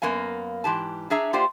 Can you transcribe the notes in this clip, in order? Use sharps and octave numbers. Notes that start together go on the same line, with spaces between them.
F#2 A#3 B3 F5 G#5
G#2 E3 G4 A5
D4 G#4 E5 A#5
A#3 F4 G4 C5 D5 F#5